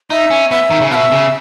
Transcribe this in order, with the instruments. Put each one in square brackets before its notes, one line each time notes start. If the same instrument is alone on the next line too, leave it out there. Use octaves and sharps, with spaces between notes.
[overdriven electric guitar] D#4 [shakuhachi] E5
[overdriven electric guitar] C#4
[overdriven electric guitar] B3 [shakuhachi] E5
[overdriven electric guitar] D#3
C#3
[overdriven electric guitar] B2 [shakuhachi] E5 F#5
[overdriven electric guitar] C#3